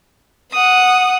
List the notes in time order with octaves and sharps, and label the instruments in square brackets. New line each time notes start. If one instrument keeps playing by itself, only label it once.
[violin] F#5 D#6